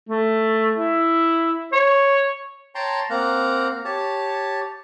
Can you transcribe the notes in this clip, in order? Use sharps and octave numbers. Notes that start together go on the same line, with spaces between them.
A3
E4
C#5
C#5 G5 A5 A#5 C6
A#3 C4 F5 F#5 A#5
G4 C#5 A5